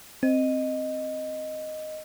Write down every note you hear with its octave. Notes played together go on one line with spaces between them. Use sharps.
C4 D#5